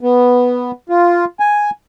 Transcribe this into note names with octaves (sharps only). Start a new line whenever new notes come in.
B3
F4
G#5